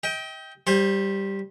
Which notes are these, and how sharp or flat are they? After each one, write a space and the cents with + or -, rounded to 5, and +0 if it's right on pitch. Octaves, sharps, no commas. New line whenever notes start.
D#5 +40 G5 +0
G3 +0 C5 +25